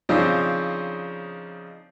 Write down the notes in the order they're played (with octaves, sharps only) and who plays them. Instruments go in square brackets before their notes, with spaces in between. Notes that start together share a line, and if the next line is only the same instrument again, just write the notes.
[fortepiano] C#3 F3 C4 D4 D#4